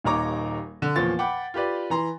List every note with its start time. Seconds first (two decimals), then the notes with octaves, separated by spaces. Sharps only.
0.04 D#1 D#2 D#4 C#5 A#5 D6
0.82 D3
0.96 E2 A#2 F3 C#5 A6
1.19 F#5 G5 B5 D6
1.54 F4 G4 B4 D5
1.90 E3 A#5 C6